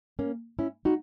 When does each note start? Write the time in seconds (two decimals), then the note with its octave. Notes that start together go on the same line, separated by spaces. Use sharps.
0.19 A#3 C#4
0.59 C#4 E4
0.85 D#4 F#4